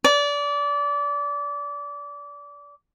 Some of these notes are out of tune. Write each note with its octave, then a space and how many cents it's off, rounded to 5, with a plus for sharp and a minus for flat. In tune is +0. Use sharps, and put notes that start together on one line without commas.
D5 -25